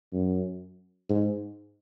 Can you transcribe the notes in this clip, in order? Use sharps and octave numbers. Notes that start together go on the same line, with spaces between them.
F#2
G#2